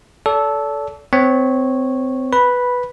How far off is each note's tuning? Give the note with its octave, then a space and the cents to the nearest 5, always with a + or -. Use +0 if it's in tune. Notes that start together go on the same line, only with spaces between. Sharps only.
A4 -10 D5 -40
C4 -25 C#5 -10
B4 +0 B5 -5